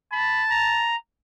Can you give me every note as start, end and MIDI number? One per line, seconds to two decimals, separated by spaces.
0.12 0.92 81
0.12 0.43 83
0.50 0.96 82